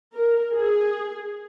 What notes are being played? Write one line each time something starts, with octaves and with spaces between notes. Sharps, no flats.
A#4
G#4